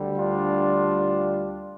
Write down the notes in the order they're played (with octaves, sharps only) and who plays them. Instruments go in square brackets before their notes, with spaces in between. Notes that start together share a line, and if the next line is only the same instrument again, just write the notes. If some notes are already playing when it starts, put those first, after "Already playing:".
Already playing: [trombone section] D2 D3 G3
D4 F4